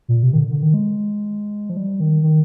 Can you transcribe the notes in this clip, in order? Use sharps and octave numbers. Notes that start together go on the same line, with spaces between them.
A#2
C3
D#3
D3
D3
D#3
G#3
F3
G3
D#3
D#3